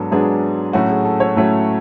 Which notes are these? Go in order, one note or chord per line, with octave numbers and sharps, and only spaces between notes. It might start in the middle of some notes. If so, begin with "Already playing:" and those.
Already playing: G#2 F#3 B3 D4 A4
G#2 F#3 B3 D4 G#4
A2 F#3 A3 C#4 F#4
G#4
A4
C#5
A2 F#3 A3 C#4